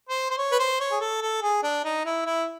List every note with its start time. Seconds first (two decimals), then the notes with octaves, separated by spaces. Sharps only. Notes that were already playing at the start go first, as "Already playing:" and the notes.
0.09 C5
0.30 C5
0.38 C#5
0.52 B4
0.59 C5
0.80 C#5
0.91 G#4
1.01 A4
1.22 A4
1.42 G#4
1.63 D4
1.84 D#4
2.06 E4
2.26 E4